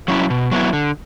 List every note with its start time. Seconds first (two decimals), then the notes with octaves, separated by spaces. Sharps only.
0.08 F#3 C#4 E4
0.30 B2
0.52 F#3 B3 E4
0.73 D3